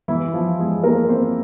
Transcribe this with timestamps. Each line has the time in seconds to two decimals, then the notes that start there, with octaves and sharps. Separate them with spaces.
0.08 E3 E4
0.33 F3 F4
0.59 G#3 G#4
0.84 A#3 A#4
1.09 C4 C5